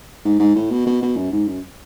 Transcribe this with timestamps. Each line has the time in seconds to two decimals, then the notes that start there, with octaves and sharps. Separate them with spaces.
0.25 G#2
0.39 G#2
0.55 A2
0.71 B2
0.86 B2
1.02 B2
1.16 F#2
1.32 G#2
1.47 F#2